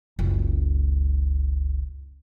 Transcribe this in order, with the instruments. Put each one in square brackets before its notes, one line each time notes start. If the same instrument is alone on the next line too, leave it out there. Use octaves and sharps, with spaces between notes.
[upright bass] F#1 C#2